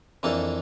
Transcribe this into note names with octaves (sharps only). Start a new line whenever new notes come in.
F2 E3 A#3 D4 A4